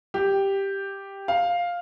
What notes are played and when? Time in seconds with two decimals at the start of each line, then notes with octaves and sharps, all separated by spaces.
0.14 G4
1.28 F5